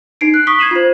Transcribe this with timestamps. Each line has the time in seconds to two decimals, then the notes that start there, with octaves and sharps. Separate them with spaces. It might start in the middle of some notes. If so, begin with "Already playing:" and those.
0.21 D#4 C7 D7
0.34 F#6
0.47 C#6 D#6 B6 G7
0.59 G#6 C7 D#7 E7 F#7
0.71 F4 C5